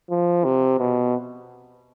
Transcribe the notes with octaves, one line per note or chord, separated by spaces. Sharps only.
F3
C3
B2